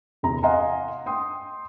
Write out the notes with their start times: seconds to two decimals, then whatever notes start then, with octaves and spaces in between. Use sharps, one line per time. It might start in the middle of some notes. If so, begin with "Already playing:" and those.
0.23 E2 C3 A#5
0.43 D#5 F5 F#5 G#5 A#5 C6
1.06 G5 C6 D#6